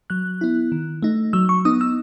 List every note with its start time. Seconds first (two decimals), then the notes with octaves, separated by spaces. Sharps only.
0.10 F#3 F#6
0.41 B3 E4
0.72 D#3
1.02 A3 D#4
1.33 F#3 E6
1.49 C#6
1.65 B3 D#4 D#6
1.81 E6